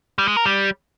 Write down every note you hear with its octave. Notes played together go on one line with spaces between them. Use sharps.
G3
G#3
A#4
G3